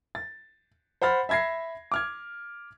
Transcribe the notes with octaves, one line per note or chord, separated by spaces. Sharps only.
A6
C5 F#5 B5 F6 A6
E5 B5 G#6 A#6 C7
D6 F6 G#6